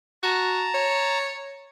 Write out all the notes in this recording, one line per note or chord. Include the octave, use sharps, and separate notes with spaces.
F#4 A5 A#5
C#5